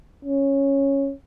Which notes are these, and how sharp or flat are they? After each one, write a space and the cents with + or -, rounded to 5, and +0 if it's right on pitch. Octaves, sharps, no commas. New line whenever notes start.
C#4 -10